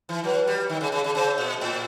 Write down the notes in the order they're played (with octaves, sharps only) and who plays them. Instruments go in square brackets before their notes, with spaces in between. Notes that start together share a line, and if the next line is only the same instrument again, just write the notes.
[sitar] E3
[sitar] F#3 [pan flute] B4
[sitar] G3
D#3
C#3
C#3
C#3
[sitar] C#3 [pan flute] C5
[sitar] A#2
A2